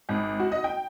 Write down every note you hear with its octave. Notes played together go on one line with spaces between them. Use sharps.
G#1
F#4
D#5
G5